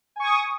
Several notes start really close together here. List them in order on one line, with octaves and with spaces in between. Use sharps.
G#5 C#6 D#6